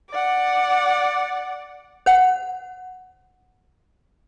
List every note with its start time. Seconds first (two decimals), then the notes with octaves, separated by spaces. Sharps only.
0.10 D5 F#5
2.06 C5 F#5